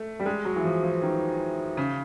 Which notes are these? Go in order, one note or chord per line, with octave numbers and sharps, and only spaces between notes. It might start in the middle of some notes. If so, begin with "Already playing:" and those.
Already playing: A3
G3
G#3
F#3
E3
F3
F3
D#3
C#3